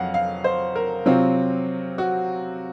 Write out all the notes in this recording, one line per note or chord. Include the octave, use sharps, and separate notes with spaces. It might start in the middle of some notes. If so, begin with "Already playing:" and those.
Already playing: F2 F#3 F5 F#5
F5
C5
A#4
C3 F#3 C4 F4
F#4